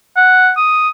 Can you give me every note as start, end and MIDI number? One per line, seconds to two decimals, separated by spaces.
0.16 0.51 78
0.57 0.89 87